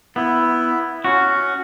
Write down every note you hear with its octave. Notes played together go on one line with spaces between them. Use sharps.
B3 E4
C#4 F#4